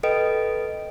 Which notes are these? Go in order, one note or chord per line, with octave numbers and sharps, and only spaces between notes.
A4 B4 D#5 G5 D7